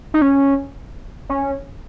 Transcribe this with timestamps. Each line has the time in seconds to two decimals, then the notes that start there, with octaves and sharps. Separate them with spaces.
0.14 D#4
0.22 C#4
1.29 C#4